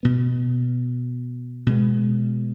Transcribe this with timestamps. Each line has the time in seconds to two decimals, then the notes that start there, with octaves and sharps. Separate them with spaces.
0.03 B2 B3
1.66 B2 G#3 B3